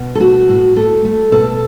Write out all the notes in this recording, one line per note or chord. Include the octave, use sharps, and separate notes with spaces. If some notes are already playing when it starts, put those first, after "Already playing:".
Already playing: B2
A4
A3 F#4
A2
A3 A4
A3
B2 A4